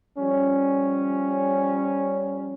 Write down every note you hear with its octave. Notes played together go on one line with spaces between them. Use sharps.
F3 G3 C#4